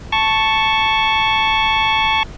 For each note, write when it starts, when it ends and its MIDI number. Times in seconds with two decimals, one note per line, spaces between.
0.12 2.23 81
0.12 2.23 85